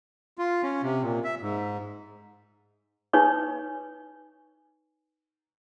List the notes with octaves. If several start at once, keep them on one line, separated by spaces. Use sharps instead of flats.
F4
C#4
C3
A#2
E5
G#2
D#4 B4 C#5 G#5 C#6